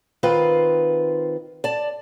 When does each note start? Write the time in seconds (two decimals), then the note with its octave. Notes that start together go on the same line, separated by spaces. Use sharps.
0.23 D#3 C4 F4 B4
1.64 D5 A5